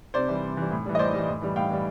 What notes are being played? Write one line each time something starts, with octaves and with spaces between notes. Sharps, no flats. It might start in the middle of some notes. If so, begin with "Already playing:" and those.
C3 C5 D5
E3 G3
C3
E3 G3
A2
E3 G3
D#5
A2 C5 D5
E3 G3
A2
E3 G3
A2 F5 G5
E3 G3